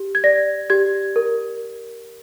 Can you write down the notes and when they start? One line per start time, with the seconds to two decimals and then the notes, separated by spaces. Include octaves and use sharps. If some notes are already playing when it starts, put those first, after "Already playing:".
Already playing: G4
0.15 G#6
0.24 D5 A#6
0.70 G4 G#6
1.16 A#4